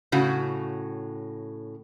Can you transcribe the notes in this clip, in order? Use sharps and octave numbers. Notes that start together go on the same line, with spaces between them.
A2 C#3 F#4